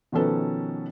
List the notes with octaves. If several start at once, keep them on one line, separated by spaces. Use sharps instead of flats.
B2 D#3 F3 C#4 A4 B4